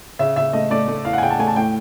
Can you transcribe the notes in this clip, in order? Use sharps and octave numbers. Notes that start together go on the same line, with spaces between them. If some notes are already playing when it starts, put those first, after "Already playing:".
C#3 E5
C#3 E5
A3 D#5
A3 D5
A3
E2 F5
F#5
G#5
C#3 G5
A5
A3 G#5
A5
A2 G5